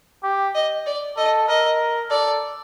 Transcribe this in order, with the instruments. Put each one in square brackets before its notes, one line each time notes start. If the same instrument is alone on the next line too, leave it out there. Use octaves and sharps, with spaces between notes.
[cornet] G4
[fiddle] D#5
D5
[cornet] A4 [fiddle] D#5
[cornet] A#4 [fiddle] D#5
[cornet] A4 [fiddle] D5